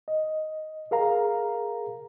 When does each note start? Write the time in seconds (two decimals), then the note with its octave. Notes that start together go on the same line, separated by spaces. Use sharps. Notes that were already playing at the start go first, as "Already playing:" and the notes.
0.08 D#5
0.91 G#4 A#4 F5 A#5